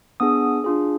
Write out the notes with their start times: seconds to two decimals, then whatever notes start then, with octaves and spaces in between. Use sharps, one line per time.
0.20 B3 D4 G#4 D#6
0.64 D4 F4 G#4